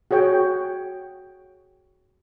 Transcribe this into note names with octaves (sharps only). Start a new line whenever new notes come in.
F#4 G#4 C#5 G5